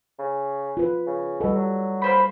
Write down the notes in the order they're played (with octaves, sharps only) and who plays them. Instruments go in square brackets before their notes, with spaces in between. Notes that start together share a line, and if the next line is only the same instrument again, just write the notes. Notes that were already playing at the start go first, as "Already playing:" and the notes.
[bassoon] C#3
[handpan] F4 B4
[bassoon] C#3
[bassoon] B2 [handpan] G3 A4
[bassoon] F#3
[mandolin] A#3 C5 B5